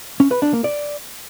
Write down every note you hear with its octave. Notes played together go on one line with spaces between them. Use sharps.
C#4
B4
D4
A#3
D5